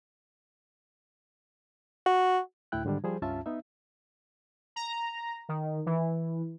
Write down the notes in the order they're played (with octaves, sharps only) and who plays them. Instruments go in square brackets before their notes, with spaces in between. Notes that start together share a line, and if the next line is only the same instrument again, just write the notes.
[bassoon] F#4
[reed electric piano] D2 A2 E4 G5 F#6
G#2 D3 D#3 G3 D4
F3 G3 G#4 C5
C#2 G2 C#4 F4 E5 A5
B3 D#4 E5
[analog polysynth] A#5
D#3
E3